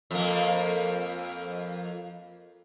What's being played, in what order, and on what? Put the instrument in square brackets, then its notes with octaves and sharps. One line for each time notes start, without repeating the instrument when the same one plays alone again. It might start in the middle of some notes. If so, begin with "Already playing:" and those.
[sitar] F2 A#3